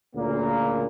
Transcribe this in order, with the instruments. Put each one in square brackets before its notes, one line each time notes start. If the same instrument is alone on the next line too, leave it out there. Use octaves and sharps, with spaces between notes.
[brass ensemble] D2 A#2 C#3 A#3